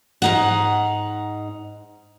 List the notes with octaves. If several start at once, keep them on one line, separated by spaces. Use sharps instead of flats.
G#2 D#4 F#5